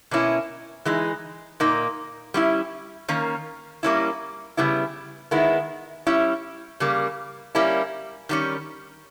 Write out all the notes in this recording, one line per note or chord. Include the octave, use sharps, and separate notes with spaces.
B2 A#3 C#4 E4
E3 G#3 D#4
A#2 A#3 D#4
G3 C#4 E4
D#3 A#3 C#4
G3 A#3 C#4 E4
C#3 G3 B3 E4
D#3 G#3 B3 E4
G3 C#4 E4
C#3 G3 A#3
G3 A#3 C#4 E4
D#3 G3 C#4